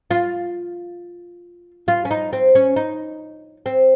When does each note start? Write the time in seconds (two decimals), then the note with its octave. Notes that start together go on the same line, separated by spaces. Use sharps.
0.11 F4
1.88 F4
2.05 C#4
2.11 D#4
2.33 C4
2.55 C#4
2.76 D#4
3.66 C4